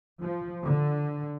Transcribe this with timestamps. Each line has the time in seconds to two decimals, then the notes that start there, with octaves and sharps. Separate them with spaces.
0.21 F3
0.65 D3